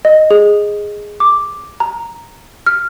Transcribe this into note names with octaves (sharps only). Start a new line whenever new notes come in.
D#5
G#4
D6
A#5
F6